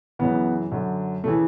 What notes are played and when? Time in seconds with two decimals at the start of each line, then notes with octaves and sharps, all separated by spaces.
0.19 F#2 C#3 E3 B3
0.72 F#2 D3
1.24 C#3 E3 A3